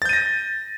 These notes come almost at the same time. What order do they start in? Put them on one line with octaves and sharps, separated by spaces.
A6 G6 D#7 A#6